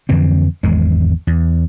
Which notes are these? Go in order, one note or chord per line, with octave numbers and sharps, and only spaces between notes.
F2 D3 E3 C4
G#1 E2 G#3
E2